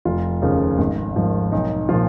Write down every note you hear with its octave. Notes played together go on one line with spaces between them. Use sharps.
F1 F4
D#2 C#3 F3
G#1
G#2 F3
B1 D#4
A#2 F3 F4